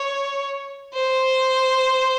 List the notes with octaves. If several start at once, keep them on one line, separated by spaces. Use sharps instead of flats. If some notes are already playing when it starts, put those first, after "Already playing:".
Already playing: C#5
C5